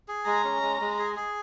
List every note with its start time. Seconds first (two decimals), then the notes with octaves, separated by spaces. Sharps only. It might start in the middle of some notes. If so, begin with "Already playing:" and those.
0.08 G#4
0.26 G#3 A#5
0.44 C#4
0.62 G#3
0.81 G#3
0.99 G#4
1.16 G#4